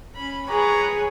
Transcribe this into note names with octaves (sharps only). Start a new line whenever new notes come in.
C#4 B5
G#4 B4 C#5 A#5